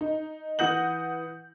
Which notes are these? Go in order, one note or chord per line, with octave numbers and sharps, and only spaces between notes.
D#4
E3 F#5 D#6 G6 A#6 F#7